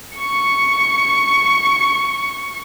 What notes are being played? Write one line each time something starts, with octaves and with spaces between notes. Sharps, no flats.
C#6 C#7